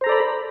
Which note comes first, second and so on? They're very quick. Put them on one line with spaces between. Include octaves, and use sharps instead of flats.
C5 A#5 A4 D5 B5